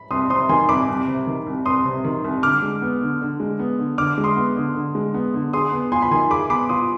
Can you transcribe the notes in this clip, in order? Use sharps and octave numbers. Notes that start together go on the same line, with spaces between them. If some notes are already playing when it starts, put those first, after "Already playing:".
Already playing: B5
C2 C6 D#6
C3 C6 D#6
D#3 G#5 C6
C2 B5 D6
C2
C3
D#3
C2
C2 C6 D#6
C3
D#3
C2
D3 D6 F6
G#3
B3
D3
D3
G#3
B3
D3
D3 D6 F6
G#3
C6 D#6
B3
D3
D3
G#3
B3
D3
G#4 C6 D#6
B3
F4 G#5 C6
B5
D#3 G#5 C6
G#4 B5 D6
B3 B5 D6
F4 C6 D#6